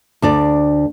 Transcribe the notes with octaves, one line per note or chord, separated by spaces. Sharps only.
D2 D4 D5